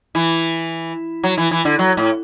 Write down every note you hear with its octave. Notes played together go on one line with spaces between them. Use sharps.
E3
F#3
E3
E3
D3
F#3
A2